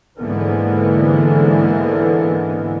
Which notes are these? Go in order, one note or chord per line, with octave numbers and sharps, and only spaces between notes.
G#2 D3 E3 G#3 A#3 B3